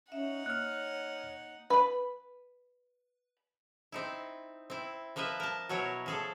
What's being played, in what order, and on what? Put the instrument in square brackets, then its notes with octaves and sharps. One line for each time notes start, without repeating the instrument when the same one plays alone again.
[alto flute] C#4 [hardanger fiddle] D#4 F#5 [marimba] E5
[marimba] A#3 [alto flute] C#5 [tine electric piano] F6 F#6
[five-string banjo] B4 B5
[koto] C4 D#4 E4
C4 E4
F3 A#3 B4 D#5 E5
A#4 A5
B2 F#3 E4 A#4 C#5
F3 G#4 A4